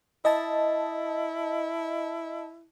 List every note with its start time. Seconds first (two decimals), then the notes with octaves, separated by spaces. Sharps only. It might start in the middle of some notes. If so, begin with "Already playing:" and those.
0.25 E4 D#5 A5